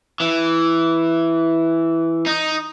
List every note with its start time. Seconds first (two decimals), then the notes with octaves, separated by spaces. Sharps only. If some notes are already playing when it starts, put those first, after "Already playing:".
0.20 E3
2.26 D#4